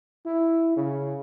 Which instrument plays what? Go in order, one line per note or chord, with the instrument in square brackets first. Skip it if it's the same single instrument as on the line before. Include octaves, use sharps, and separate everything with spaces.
[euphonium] E4
C#3